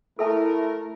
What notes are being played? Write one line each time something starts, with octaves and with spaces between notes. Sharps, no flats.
A3 E4 A4 A#4 E5 A5